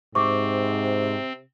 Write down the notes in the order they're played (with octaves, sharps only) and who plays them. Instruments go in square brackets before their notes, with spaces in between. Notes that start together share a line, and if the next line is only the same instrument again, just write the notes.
[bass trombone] G#2 [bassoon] C3 [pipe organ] C4 [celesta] C#6 D6